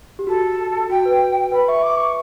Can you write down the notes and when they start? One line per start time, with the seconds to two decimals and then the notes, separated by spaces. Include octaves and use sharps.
0.19 G4
0.27 F#4 A4
0.90 F#4 G5
1.05 B4
1.52 B4 B5
1.68 E5 C#6
1.82 D6
1.96 C#6